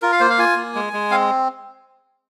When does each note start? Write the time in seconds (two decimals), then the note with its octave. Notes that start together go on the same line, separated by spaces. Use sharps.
0.02 F4 A#4
0.12 F5
0.20 A#3 C5
0.30 F5
0.38 F4 G#5
0.56 A#3
0.75 G#3
0.93 G#3
1.11 C4 F5